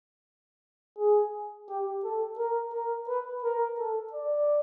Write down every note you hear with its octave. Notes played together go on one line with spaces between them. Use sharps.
G#4
G4
A4
A#4
A#4
B4
A#4
A4
D5